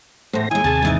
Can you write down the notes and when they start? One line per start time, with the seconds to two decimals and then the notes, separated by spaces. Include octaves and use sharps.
0.33 E2 A2 A3 C5 A#6
0.51 D#2 G#3 E4 G#5
0.64 D#2 C3 G#4 A5 A6
0.82 G#2 E3 D#4